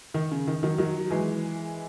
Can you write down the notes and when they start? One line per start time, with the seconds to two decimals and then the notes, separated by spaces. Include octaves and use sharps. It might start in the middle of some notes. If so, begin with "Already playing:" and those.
0.14 D#3
0.32 C#3
0.48 D#3
0.63 D#3 F#3
0.78 D#3 F#3
1.10 E3 G#3